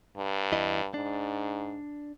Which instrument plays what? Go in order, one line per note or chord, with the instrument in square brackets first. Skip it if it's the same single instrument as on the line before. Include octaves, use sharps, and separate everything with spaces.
[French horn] G2
[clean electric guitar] E2 E4 D#5
[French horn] G#2 [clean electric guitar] D4